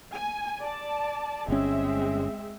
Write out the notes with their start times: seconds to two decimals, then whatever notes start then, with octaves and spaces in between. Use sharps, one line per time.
0.14 G#5
0.60 D5 A5
1.48 G1 G#3 C4 C#4 E5